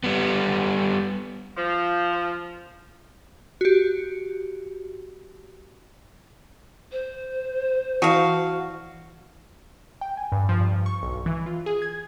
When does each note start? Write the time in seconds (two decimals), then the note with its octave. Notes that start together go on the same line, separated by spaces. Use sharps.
0.04 G3 B3
1.56 F3
3.61 F#4 G4
6.92 C5
8.02 E3 E4 F#4 F5 A5
10.01 G5
10.17 G#5
10.32 G2
10.49 F3
10.60 G2
10.86 C#6
11.03 B1
11.26 E3
11.46 F4
11.66 G#4
11.82 G#6